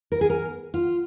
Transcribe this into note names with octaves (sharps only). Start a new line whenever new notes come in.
A#4
G#4
A#4
F4